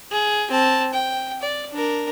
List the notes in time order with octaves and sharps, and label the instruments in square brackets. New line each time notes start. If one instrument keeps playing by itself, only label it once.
[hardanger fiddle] G#4
C4 A5
G5
D5
D4 A#4